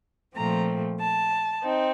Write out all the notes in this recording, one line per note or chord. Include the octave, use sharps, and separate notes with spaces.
A#2 F3 A3 C4 A#5
A5
C4 D#4